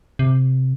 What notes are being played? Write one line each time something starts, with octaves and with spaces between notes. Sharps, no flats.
C3